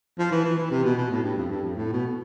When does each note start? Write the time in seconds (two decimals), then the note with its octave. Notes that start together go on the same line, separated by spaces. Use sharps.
0.19 F3
0.31 E3
0.44 E3
0.58 E3
0.71 C3
0.84 B2
0.97 B2
1.10 A2
1.23 G2
1.36 F2
1.50 G2
1.63 F2
1.76 A2
1.93 B2